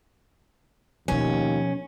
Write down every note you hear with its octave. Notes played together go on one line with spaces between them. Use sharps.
D#2 B2 F3 C#4